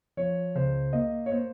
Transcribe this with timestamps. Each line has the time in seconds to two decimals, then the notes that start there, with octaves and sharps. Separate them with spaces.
0.17 F3 C#5
0.55 C#2 C5
0.93 A#3 D#5
1.26 C#5
1.32 A#3 C5